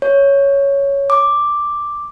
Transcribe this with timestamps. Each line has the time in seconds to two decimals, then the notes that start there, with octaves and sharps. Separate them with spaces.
0.02 C#5
1.10 D6